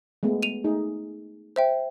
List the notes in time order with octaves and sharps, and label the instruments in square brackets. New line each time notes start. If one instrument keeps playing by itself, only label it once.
[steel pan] G#3 A3 B3
[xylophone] D#7 F7
[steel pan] A3 D#4 G#4
[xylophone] C5 E5 G5